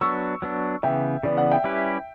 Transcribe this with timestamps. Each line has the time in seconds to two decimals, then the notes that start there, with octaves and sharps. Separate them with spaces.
0.01 F#3 B3 D4 C#6 E6
0.42 F#3 B3 D4
0.83 C#3 E3 B3 E5 G5
1.23 C#3 E3 B3 D5
1.37 D5 F#5
1.51 E5 G5
1.64 G3 C#4 E4 G4 B4